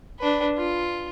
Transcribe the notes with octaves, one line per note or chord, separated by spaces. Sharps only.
D4 B4
F4